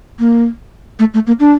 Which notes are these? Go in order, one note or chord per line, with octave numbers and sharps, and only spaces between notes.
A#3
A3
A3
A#3
D4